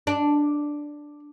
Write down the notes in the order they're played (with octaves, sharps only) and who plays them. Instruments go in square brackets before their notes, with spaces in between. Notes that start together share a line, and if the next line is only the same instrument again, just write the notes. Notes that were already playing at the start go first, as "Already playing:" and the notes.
[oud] D4